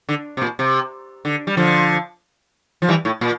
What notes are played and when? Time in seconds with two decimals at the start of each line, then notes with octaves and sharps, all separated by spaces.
0.09 D3
0.37 C3
0.42 A#2
0.59 C3
1.25 D3
1.47 G3
1.57 D3 F3
2.82 F3
2.88 E3 G3
3.05 A2
3.21 A#2